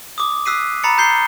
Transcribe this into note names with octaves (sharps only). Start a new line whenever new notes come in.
D6 D#6
D#6 E6 F#6 B6 C7 D#7
A#5 B5 A6 C#7
A#5 G6 C7 G7